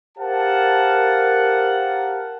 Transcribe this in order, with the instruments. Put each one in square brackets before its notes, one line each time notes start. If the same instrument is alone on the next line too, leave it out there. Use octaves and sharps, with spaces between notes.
[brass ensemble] G4 A#4 C5 F5 F#5 A5